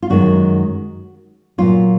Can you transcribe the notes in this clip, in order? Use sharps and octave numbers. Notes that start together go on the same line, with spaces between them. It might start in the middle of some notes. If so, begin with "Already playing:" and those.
F4
F#2 D#3 G#3 F#4
A#2 F#3 F4